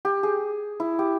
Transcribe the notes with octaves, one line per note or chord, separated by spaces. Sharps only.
G4
G#4
E4
G4